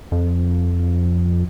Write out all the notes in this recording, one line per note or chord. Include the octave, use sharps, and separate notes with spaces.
F2